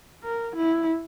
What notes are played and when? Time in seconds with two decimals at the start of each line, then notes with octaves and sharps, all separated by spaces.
0.24 A#4
0.56 E4